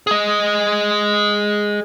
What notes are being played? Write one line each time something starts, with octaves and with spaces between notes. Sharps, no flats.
G#4 D#5